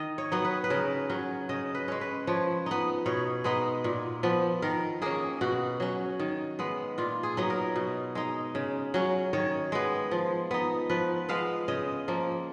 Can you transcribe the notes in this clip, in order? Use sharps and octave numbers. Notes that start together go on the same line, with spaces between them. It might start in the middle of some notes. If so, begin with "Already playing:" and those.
Already playing: D#3 D#5
C#5
F#3 B3 D#4
B4
B4
C#3 A#4
F#3 C#4
C#3 D#5
B4
G#3 C#4
B4
F3 C#5
B3 D#4
B2 C#5
G#3 B3 D#4
A#2
F3 B3
D#3 A#4
A#3 C#4 G#4
B2 F#4
F#3 C#4
D#3
G#3 B3
A#2 F4
G#4
F#3 B3 D#4
A#4
B2
G#3 D#4
C#3
F#3 C#4
D#3 C#5
G#3 B3
F3
B3 D#4
F3 B4
G#3 B3 F5
C#3 D#5
F3 A#3